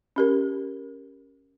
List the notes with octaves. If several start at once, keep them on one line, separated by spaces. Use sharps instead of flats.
C#4 G4 A#4